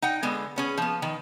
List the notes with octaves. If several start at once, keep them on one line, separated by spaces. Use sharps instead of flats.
D#4 F#5 G5
D3 G#3 B3
B3 C#4 G#4
F3 B3
D#3